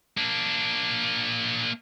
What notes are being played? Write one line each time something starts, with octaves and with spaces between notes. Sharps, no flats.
A#3 D4